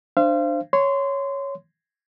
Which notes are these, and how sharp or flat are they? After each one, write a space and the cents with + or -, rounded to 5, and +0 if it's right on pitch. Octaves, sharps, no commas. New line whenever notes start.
D4 +20 C5 +0 F5 -35
C#5 +0 C6 -20